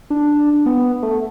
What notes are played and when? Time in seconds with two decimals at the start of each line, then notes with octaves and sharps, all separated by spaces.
0.10 D4
0.66 B3
1.03 A3